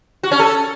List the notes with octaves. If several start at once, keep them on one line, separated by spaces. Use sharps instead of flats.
F#4
C#4
A4